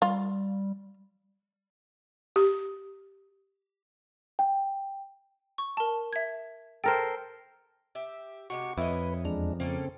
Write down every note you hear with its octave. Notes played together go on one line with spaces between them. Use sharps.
G3 F4
G4
G5
C#6
A#4 A5
E5 G#6
A4 A#4 C5 G5
G4 E5
C3 G#3 F#4 G4 C#6
F2 E4 B4 C#5 D#5
E2 G#3 D4 A#5
C#3 A#3 C4 C#4 A4